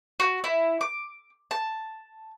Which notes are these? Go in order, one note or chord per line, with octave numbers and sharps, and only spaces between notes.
F#4
E4
D6
A5